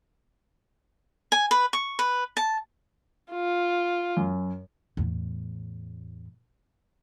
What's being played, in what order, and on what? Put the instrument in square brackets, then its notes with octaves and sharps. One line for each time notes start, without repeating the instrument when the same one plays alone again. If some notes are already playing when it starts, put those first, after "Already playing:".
[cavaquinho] G#5
B4
C#6
B4
A5
[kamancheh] F4
[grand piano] F#2
[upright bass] E2 A2